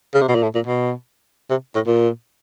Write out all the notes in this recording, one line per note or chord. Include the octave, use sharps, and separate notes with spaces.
C#3
C3
B2
A#2
A2
A#2
B2
C3
A2
A#2